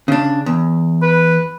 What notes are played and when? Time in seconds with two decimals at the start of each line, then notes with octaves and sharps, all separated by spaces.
0.08 C#3 D4
0.46 E2
1.02 B4